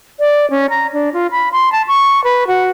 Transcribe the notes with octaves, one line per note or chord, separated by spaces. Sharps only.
D5
C#4
A#5
D4
F4
B5
C6
A5
C#6
B4
F#4